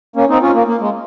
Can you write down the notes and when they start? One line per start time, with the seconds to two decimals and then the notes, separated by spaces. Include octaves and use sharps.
0.16 A#3 C#4
0.29 C4 D#4
0.42 C#4 F4
0.54 A#3
0.68 A#3
0.81 G#3